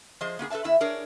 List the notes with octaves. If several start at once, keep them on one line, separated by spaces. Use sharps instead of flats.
F3 G#4 C5 D#5
A#3 B3 G4 G#4
A4 B4 D5 E5 A5
E2 B3 E4 E5
D4 G#4 A#4 C#5